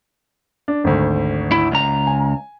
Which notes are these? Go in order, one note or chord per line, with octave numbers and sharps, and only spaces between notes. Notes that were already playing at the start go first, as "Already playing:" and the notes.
D4
G#1 D2
E4
C#2 A#5
G#5